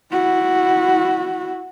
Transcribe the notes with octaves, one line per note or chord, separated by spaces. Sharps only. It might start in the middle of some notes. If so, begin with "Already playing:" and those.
E4 F#4